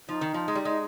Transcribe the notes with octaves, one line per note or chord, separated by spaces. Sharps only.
F3 D#4
D#3
F3
G#3
G3
G#3